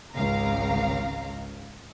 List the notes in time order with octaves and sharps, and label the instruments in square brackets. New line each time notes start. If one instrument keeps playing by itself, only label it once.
[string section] G#1 C#2 F5 A#5